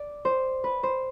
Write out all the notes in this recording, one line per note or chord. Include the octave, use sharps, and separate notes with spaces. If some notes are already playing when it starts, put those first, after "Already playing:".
Already playing: D5
C5
B4
C5